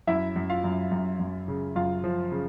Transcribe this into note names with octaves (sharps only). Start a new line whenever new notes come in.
F#2 E4 E5
F#2
F4 F5
F#2
F#2
F#2
C#3
F#2 F4 F5
F3
C#3